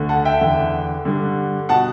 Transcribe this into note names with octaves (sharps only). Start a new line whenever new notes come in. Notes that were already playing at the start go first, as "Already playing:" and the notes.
Already playing: D2 D3
F#5 A5
E5 G5
E2 D3
G2 D3
B2 F#5 A5